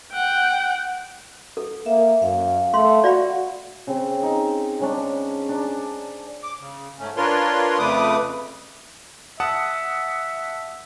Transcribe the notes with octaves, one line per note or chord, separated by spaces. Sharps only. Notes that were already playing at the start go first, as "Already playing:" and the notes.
F#5 G5
A4
A#3 E5
F#2 F5
A3 C6
F#4 D5 F5 B5
C#3 C4
D#4
C#3 G#3 C#4 D4
D4 D5 A5 A#5
D6
C#3
G#2 A3 C#4
D4 F4 A#4 B4 C#5 C6
F2 C#3 A3 B4 D6 D#6
E5 F#5 A5 D#6